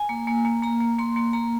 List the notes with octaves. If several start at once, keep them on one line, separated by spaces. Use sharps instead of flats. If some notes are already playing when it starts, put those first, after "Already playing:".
Already playing: G#5
A#3
A#3
A#3
A#3 A#5
A#3
A#3 C6
A#3
A#3 A#5